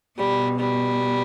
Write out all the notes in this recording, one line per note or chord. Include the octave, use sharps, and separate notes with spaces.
B2 G3
G3